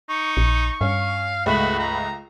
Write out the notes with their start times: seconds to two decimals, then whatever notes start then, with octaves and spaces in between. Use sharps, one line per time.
0.09 D#4 C#6
0.37 A#1
0.81 G2 C#4 F5
1.46 C#2 G#3 A3 F#4 B5
1.79 A#5